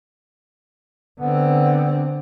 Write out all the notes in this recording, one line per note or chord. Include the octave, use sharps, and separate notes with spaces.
D3 B3 C4